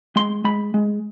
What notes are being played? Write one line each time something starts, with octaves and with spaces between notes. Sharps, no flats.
G#3 C6
G#3 B5
G#3